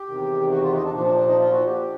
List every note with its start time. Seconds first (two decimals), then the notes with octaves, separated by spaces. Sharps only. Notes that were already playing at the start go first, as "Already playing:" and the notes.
Already playing: G4
0.08 E2 C3 D#3
0.51 F#4
0.62 F4
0.73 D#4
0.84 D4
0.95 A#2 D4
0.98 F3
1.05 D4
1.16 D4
1.27 D#4
1.38 F4
1.52 F#4
1.66 G4
1.82 D3